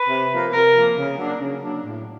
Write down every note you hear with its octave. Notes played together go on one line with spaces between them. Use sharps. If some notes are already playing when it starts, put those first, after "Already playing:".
Already playing: B4
C3
F3 A#3
C3 A#4
F3 A#3
C#3
F#3 A#3 D4
C#3
F#3 A#3 D4
A2